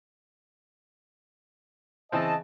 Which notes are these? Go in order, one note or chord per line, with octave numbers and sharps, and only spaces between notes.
C#3 E3 C4 D#5 A5